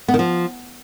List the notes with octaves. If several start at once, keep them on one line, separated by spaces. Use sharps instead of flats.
B3
D#3
F3